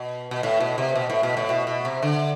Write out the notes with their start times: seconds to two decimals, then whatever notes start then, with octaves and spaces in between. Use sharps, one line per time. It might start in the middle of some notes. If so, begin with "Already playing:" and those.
Already playing: B2
0.31 B2
0.43 A2
0.60 B2
0.78 C3
0.96 B2
1.10 A2
1.23 B2
1.37 A2
1.49 B2
1.67 B2
1.85 C3
2.02 D3